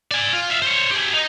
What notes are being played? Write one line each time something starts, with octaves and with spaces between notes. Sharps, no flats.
D5 G#5
F4
E5 F5
C5 C#5
G4 G#4
D#4